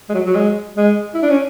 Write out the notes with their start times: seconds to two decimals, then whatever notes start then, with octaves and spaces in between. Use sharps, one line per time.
0.09 G#3
0.14 F#3
0.26 F#3
0.35 G#3
0.76 G#3
1.14 E4
1.22 D4
1.30 C#4